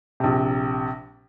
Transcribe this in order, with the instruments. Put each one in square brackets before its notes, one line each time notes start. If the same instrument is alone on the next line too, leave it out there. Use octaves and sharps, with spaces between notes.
[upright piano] A#1 C3